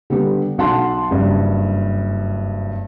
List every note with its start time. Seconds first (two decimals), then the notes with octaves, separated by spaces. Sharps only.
0.10 D3 G3 B3 G4
0.58 B1 F#5 A5 C6
1.11 F#1 G2